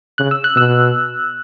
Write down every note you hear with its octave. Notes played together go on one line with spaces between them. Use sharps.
C#3 F#6
E6
F#6
B2 E6